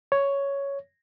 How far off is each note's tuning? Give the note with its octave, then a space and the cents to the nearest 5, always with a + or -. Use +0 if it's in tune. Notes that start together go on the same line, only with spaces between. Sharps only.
C#5 +5